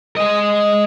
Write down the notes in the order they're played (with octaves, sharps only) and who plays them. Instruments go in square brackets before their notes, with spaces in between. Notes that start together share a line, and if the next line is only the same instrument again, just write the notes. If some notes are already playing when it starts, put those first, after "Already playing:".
[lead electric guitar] G#3 D#5